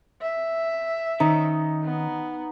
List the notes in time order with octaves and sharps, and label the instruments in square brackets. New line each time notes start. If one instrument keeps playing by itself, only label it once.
[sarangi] E5
[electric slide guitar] D#3 C#4 [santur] D#4
[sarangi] B3